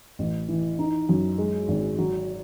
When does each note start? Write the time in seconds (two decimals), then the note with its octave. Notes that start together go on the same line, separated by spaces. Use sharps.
0.19 A1
0.49 E3
0.79 D#4
1.09 F#2
1.38 G#3
1.68 G#1
1.99 F#3